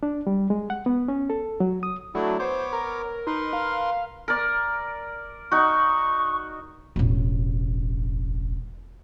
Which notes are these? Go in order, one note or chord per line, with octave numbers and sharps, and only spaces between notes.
D4
G3
G#3
F#5
B3
C#4
A4
F#3
D#6
F#3 A3 D4 E4
B3 C5 C#5 D6
A#4
D#4 A#4 B4 C6
F5
A#4 D5
D#4 F#4 C#6
E1 A1